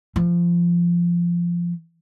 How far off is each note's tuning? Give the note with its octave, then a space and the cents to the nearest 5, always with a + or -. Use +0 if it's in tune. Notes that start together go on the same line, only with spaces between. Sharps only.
F3 -15